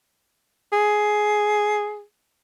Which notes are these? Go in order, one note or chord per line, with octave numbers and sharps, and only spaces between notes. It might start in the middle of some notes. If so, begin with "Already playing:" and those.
G#4